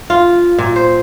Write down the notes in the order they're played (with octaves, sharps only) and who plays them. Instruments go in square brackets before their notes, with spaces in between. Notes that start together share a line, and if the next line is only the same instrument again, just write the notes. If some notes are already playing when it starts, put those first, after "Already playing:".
[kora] F4
A#2
C5